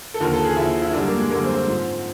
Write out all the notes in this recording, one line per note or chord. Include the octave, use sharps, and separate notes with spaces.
A4
D#2 D3 F3 A#4
A4
G#4
D#2 D3 F3 E4
E4
F#2 D3 G3 D4
A#3
G#3
F#2 D3 G3 A#3
C4
C4
G#2 F3